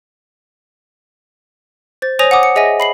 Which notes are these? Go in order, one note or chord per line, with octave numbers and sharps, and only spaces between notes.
C5 A6
C5 C#5 G#5 D#6 A#6 F7
F#5 G#5 D6 D#6
C#7
G#4 D#5 E5 G#5 A#6
B5 C7 F#7